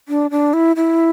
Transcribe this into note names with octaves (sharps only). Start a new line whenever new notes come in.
D4
D4
E4
E4